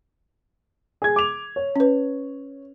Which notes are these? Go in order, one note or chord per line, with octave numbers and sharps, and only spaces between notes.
G#4 G#6
D6 F7
C#5
C#4 B4